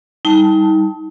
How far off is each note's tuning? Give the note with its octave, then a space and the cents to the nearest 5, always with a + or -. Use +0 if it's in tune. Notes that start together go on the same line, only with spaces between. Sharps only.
G3 +0 D#4 +35 A5 +0